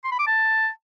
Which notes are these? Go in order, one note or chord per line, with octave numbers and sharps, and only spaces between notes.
C6
B5
D6
A5